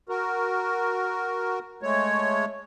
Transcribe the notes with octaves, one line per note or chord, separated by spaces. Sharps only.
F#4 A#4
G#3 A3 C#5